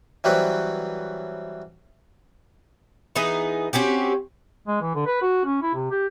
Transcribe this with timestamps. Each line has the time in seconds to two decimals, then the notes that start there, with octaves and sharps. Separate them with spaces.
0.24 E3 F#3 G3 C4 B4 C#5
3.16 E3 B3 D#4 G#4
3.73 C4 C#4 F#4 G4
4.68 G#3
4.81 E3
4.95 D3
5.06 B4
5.22 F#4
5.45 C#4
5.62 E4
5.74 C3
5.91 G4